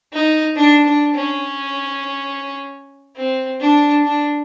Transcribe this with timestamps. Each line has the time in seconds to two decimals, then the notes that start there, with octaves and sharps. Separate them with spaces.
0.13 D#4
0.56 D4
0.86 D4
1.14 C#4
3.17 C4
3.60 D4
4.03 D4